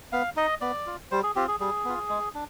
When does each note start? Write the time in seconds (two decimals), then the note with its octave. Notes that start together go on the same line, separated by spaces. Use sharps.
0.12 B3 F5
0.36 D#4 D#5
0.61 B3 D5
0.87 F4
1.11 G3 C5
1.23 G#4
1.35 C4 F4 G4
1.48 G#4
1.60 G3 G#4
1.85 B3 F4
2.09 G#3
2.34 D4